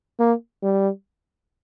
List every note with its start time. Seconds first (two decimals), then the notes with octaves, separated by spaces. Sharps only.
0.20 A#3
0.63 G3